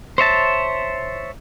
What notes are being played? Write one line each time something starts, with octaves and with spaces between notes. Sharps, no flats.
C5 C#5 E5 A5